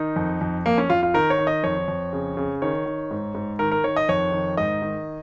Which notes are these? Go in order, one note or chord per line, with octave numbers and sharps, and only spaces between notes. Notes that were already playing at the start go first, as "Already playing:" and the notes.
Already playing: D#3 D#4
F2
F2
F2 A#3
C#4
F2 F4
F4
D#3 A#4
C#5
D#3
D#5
F2 C#5
F2
C#3
C#3
D#3 C#5
D#3
G#2
G#2
D#3 A#4
A#4
D#3 C#5
D#5
F2 C#5
D#3
G#2 D#5
D#3